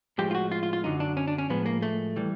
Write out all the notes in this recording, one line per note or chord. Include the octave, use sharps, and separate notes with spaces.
A2 F3 G#3 G4
F4
F#4
F4
F4
F4
F#2 D3 F#3 D#4
D4
C#4
D4
C#4
A2 F3 G#3 B3
A#3
A3
E3 G3